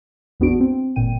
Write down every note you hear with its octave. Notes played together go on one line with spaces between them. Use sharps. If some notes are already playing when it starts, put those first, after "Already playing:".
A1 E2 B3 D4 F#4 D7
C4
G1 A#2 G5 D#7